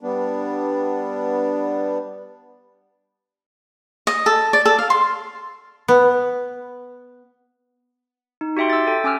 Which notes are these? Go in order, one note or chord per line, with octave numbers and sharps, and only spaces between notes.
G3 B3 D4
D#5
A4
D5
A4
F5
C6
B3
D#4
F#4 G4 E5 G5 C6
E6 A6
A4 G5
C#4 G#5 D6 E6 F6